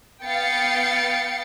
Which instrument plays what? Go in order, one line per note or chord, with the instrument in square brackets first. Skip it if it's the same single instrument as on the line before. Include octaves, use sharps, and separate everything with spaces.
[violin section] B3 F5 G5 A6 C#7